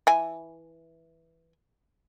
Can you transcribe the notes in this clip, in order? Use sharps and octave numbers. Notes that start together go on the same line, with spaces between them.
E3 G#5